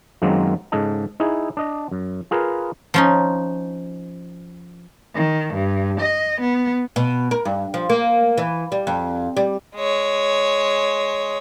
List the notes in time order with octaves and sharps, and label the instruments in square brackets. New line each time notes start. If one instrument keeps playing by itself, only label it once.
[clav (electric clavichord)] F#2 D#3 F#3 G#3 A#3 C4
G#2 C#3 A4 D#5 A5
D#4 E4 G#4
D4 D#5
F#2
F4 G#4 A#4 B4 F5
[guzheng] F3 C#4 D#4
[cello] D#3
G2
D#5
B3
[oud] B2
A#4
G2
F3
A#3
E3
G3
F2
G3
[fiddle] G#3 C#5